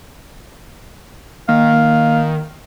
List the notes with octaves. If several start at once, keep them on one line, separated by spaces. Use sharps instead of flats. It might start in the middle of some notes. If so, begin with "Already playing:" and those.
D#3 A#3 F5